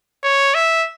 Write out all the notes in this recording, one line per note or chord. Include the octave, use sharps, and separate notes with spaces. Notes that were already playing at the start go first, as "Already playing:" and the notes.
C#5
E5